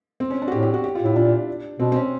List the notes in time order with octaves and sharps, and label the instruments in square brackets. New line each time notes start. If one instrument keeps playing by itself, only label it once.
[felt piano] C4
C#4
D4
F#4
[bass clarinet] A2 [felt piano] G4
[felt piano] G4
F#4
G4
F4
[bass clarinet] A2 [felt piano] E4
[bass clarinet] A#2 [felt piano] D4
[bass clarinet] B2 [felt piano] C4
[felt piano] C4
C#4